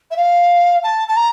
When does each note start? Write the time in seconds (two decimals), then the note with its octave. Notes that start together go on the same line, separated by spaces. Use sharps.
0.11 E5
0.17 F5
0.83 A5
1.08 A5
1.16 A#5